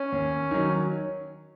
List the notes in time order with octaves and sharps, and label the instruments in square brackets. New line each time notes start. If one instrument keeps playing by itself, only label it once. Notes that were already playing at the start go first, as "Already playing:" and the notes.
Already playing: [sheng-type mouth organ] C#4
[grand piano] D#2
D#3 F#3